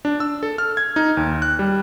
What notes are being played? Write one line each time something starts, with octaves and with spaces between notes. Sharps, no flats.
D4
E6
A4
F6
G#6
D#4
D#2
F#6
G3